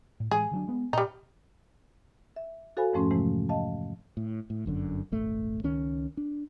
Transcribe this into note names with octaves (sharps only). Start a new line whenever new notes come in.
A2
A2 E3 G#3 G#4
D3 F#3 D4
G#3 B3
A#2 G3 D#4
E5
F#4 A4 C5 F5 G#5 B5
F2 G#2 F3 A3 C#4 C6
C3 E3 G#3 A3
D#5 F5 A5
A2
A2
G1 F#2 D3
D#1 G#1 A3
C#2 D#3 C#4
D4